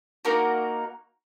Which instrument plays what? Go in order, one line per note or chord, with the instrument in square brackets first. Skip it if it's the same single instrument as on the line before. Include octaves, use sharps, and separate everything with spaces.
[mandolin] A#3 D#4 F#4 A#4